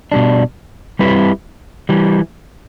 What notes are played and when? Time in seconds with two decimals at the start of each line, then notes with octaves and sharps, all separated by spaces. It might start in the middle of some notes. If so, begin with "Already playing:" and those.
0.12 B2 G3 D4
0.99 G3 C4 E4 G4 B4
1.89 E3 G3